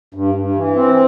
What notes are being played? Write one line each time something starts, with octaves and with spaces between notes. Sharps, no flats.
G2
G2
E3
C4